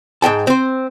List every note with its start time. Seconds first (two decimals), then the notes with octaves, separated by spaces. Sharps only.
0.22 G#2 E3 G5 A5
0.47 C4 C5